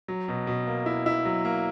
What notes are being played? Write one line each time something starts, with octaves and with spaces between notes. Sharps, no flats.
F#3
B2
B2
A#3
E4
E4
F#3
A#3